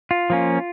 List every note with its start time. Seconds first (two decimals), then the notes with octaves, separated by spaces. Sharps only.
0.11 F4
0.30 F3 A#3 C#4